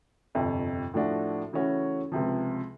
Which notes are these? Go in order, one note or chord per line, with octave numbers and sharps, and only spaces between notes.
G1 F2 C3
A2 F3 A3 D4 F#4
C#3 E3 A3 C#4 F#4
C#2 C3 F3